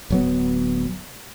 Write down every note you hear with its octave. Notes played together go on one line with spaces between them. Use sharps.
D1 F#3 B3